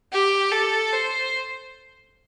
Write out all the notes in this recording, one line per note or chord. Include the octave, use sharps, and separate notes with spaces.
G4
A4
C5